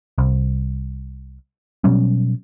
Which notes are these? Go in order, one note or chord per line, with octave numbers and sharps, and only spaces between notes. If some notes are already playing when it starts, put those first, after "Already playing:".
C2
B2 F#3 G3 C#4